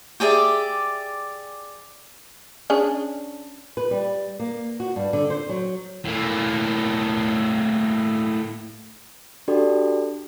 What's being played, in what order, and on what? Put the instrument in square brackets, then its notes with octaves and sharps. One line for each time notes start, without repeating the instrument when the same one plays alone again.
[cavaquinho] G4 G#4 D5 E5
[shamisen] C#4 D4 G#4
[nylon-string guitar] B4
G3
A#3
F#4
G2
D3
C5
F#3
[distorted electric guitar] A2 A#3
[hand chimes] D4 F#4 G4 A4 D5